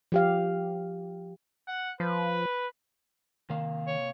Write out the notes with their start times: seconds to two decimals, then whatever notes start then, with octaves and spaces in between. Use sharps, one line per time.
0.12 F3 G4 F5
1.68 F#5
2.00 F3 B4
3.50 C3 D#3 A#3 F5
3.87 C#5